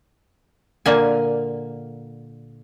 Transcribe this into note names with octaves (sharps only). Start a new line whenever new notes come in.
A#2 D3 A#3 G#5